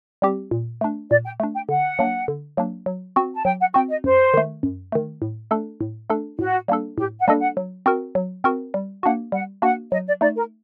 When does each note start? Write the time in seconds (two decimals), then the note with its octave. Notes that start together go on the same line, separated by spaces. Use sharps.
0.22 G3 C4 G4
0.51 A#2
0.81 A3 D4
1.11 A#2 D5
1.25 G5
1.40 A3 D4
1.55 G5
1.69 D3 F#5
1.99 F#3 A#3 D4
2.28 D3
2.57 F#3 A#3 D4
2.86 F#3
3.16 C4 F#4
3.35 A5
3.45 F#3 G5
3.60 F#5
3.74 C4 F#4 G5
3.90 D#5
4.04 F#2 C5
4.34 D#3 A3
4.63 F#2
4.92 D#3 A3
5.22 A2
5.51 A3 D4 A4
5.81 A2
6.10 A3 D4 A4
6.39 A2 F#4
6.68 G3 A#3 D4 A4
6.98 A2 G4
7.20 F#5
7.27 G3 A#3 D4 A4 D#5
7.41 F#5
7.57 F#3
7.86 C4 F#4 A#4
8.15 F#3
8.44 C4 F#4 A#4
8.74 G3
9.03 A#3 D4 F#4 F#5
9.32 G3 F#5
9.62 A#3 D4 F#4 F#5
9.92 F#3 D#5
10.07 D5
10.21 A3 D#4 D5
10.36 A#4